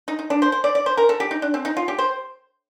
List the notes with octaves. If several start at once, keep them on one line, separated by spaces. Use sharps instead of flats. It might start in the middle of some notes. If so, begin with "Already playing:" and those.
D#4
D#4
D4
C5
C5
D5
D5
C5
A#4
A4
G4
D#4
D4
C4
D#4
F4
G4
C5